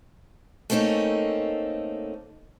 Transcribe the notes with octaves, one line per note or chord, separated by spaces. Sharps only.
A3 A#3 C4 C#4 D#4 A4